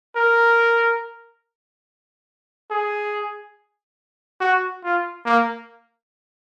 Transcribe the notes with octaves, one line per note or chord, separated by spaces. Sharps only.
A#4
G#4
F#4
F4
A#3